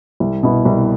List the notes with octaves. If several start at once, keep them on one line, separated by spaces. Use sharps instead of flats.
C2
B2 B3 E4
C2